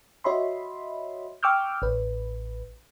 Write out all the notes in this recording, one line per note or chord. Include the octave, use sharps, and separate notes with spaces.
F#4 C#5 D#5 E5 B5 C6
G5 C#6 D6 E6 F6 G6
A1 B4